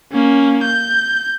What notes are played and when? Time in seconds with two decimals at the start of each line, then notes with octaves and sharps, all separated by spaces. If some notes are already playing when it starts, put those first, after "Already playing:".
0.12 A#3 C#4
0.63 G6